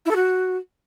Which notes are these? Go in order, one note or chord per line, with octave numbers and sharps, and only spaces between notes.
E4
A4
F#4